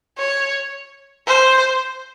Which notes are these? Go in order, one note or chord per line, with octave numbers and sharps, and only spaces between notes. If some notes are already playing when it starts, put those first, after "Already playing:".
C#5
C5